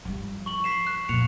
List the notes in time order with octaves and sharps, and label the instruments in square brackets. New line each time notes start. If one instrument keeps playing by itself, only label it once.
[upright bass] G2 F3
[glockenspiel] C#6 F#7
B6 C7 E7
F#6
[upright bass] F2 A#2 [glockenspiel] C#7 F7